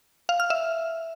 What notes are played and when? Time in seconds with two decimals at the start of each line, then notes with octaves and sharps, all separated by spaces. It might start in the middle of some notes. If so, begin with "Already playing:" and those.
0.29 F5
0.40 F6
0.50 E5